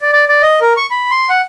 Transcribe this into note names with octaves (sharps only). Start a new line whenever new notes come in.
D5
D5
D5
D#5
A#4
C#6
B5
C6
F#5